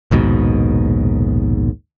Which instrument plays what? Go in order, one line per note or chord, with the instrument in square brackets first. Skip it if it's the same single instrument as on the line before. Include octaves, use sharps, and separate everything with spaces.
[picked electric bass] A#1 D#2 G#2 B2